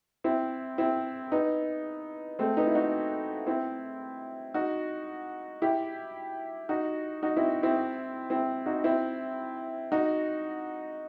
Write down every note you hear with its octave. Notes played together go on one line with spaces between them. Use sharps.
C4 E4
C4 E4
B3 D#4
A3 C4
B3 D#4
E4
D#4 F#4
C4 E4
D#4 F#4
E4 G4
D#4 F#4
D#4 F#4
C4 E4
C4 E4
C4 E4
D#4 F#4
C4 E4
D#4 F#4